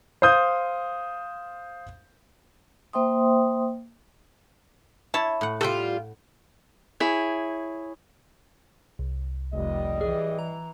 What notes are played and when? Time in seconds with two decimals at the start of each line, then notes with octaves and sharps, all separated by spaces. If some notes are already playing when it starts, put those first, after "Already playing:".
0.22 C5 F5 D#6 G6
2.93 A#3 C5 E5 G5 C6 D#6
5.14 E4 C#5 A5
5.41 A2 F#5
5.61 G3 F4 A4 F#5 G5
7.00 E4 G#4 C#5
8.99 C2
9.53 F1 G3 D#5
10.01 E3 G#4
10.39 A#5